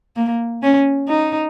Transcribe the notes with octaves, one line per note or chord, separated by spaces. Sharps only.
A#3
C#4
D#4